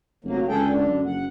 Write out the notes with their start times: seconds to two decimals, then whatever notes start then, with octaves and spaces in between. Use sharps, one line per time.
0.24 F1 F#3 A#3
0.48 C#2 G#4 A4 G5
0.65 D3 D4
0.87 F#2
1.05 F#1 F#5